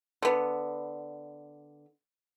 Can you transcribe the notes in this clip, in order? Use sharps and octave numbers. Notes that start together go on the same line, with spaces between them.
D3 B3